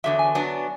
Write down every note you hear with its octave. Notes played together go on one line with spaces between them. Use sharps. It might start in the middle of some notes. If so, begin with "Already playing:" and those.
E2 D3 F#3 E5
G#5
F#3 B3 D4